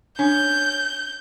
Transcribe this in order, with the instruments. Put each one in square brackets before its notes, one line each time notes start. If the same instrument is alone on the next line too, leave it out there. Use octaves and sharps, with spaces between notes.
[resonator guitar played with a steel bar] C#4 [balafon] D4 [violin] G6